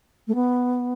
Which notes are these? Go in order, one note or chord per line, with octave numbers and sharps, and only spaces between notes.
A3
B3